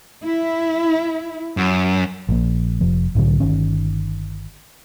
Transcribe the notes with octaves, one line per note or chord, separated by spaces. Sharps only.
E4
F#2
A#1 A#2
F1 F3
C2 A2 D3 F#3
G1 D#3 C#4